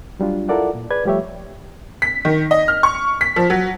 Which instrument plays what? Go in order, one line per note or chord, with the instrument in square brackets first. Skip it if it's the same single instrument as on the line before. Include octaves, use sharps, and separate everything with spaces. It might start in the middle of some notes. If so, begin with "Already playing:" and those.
[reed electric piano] F#3 G3 D4 F4
E4 F4 A4 A#4 D5 F#5
A#2
G#4 B4 D5 G#6
F3 G3 A3 G4 C#5 E5
[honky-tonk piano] B6
D#3
D#5
F6
C#6
B6
F3
F#3